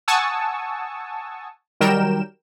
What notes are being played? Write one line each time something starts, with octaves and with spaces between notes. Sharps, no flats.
F#5 G#5 A5 C#6 D#6 E6
D#3 F#3 G3 A#4 G5 E7